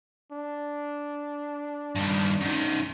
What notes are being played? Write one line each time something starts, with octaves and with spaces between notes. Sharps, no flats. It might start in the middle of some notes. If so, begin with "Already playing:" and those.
D4
G2 D#3
F#2 D#3